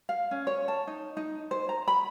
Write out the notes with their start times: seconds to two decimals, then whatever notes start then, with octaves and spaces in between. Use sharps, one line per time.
0.09 F5
0.31 C#4
0.47 C#5
0.68 A5
0.87 D#4
1.17 D#4
1.51 C5
1.69 A#5
1.88 B5